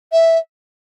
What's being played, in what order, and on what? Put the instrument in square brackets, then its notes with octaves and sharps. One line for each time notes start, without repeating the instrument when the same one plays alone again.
[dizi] E5